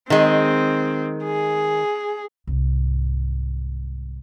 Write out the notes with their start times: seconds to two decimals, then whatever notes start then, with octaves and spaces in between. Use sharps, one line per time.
0.10 D#3 G#3 C4
1.24 G#4
2.47 C2 G#2